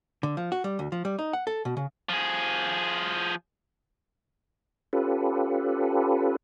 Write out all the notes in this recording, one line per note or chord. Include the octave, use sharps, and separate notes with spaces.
D3
F3
F#4
G3
D2
F3
G3
D#4
F#5
A4
B2
C#3
F3 G#4
C#4 F4 G4 A4 B4